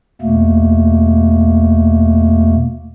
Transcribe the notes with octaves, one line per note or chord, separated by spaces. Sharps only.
E2 B2 A3 A#3